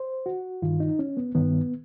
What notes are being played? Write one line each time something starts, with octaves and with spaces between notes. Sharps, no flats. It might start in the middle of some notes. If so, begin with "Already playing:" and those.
Already playing: C5
F#4
G2 D#3 F4
D#4
C#4
B3
G2 D#3 B3